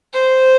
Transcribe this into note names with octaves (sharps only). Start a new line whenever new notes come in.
C5